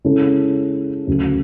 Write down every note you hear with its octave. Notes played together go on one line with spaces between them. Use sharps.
C#3 G#3 C#4 E4 A4
D2 C#3 F#3